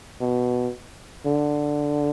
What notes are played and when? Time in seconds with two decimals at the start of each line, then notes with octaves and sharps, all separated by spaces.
0.21 B2
1.26 D3